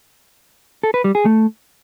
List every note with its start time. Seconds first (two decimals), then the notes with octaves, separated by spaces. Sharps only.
0.83 A4
0.94 B4
1.04 G3
1.15 G#4
1.25 A3